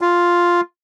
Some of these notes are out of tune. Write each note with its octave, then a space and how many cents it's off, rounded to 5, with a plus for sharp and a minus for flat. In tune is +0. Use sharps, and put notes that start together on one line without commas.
F4 +0